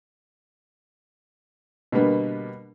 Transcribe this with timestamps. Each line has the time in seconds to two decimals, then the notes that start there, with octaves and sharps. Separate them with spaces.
1.92 B2 D3 G3 A#3 B3